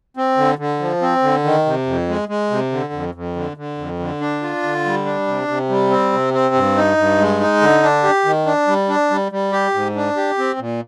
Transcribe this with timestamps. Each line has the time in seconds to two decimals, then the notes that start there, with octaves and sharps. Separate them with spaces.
0.17 C4
0.37 D3
0.58 D3
0.80 F3
1.01 C4
1.22 D3
1.44 D#3
1.66 C3
1.86 F2
2.09 G#3
2.29 G#3
2.51 C3
2.72 D3
2.93 F2
3.15 F2
3.36 D3
3.57 D3
3.78 F2
3.99 D3
4.21 D4
4.42 F4
4.63 D3
4.85 G3
5.05 D4
5.27 C3
5.48 C3
5.69 G3
5.90 C4
6.13 C3
6.34 C4
6.55 G2
6.76 D#4
6.97 G2
7.19 G#3
7.40 D#4
7.61 D3
7.83 D4
8.04 G4
8.25 D#3
8.46 D4
8.68 G3
8.89 D4
9.11 G3
9.32 G3
9.52 G4
9.74 G#2
9.96 D4
10.17 G4
10.38 C4
10.59 A#2